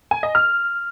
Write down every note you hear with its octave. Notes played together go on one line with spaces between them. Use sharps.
G#5
D#5
F6